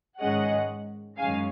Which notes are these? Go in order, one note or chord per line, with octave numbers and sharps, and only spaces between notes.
G#2 D#3 G#3 C#4 D#5 F#5
F#2 D#3 G#3 C#4 F5 G#5